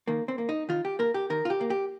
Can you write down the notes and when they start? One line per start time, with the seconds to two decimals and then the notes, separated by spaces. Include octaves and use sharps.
0.07 D#3 A#3
0.28 C4
0.38 A#3
0.49 D#4
0.69 D#3 F4
0.85 G4
0.99 A#3 A#4
1.14 G4
1.30 D#3 A#4
1.45 F4
1.50 G4
1.61 A#3
1.70 G4